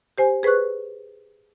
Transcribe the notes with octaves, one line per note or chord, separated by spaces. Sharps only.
G4 C5 G#5
G#4 B4 C5 C#6 F#6